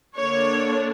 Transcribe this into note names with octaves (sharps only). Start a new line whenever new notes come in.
D3 A#3 D4 C#5